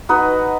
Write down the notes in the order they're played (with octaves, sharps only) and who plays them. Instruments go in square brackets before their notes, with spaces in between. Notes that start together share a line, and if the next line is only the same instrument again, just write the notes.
[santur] D#4 F#4 B4 D#5